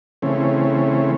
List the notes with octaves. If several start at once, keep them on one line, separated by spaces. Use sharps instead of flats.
C#3 E3 A3 C4 C#4